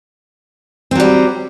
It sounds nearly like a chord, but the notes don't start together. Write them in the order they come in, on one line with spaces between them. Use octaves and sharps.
C4 F#3 G3